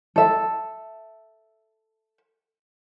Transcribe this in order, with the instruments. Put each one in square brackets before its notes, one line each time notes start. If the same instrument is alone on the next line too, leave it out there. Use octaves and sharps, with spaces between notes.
[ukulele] A4 E5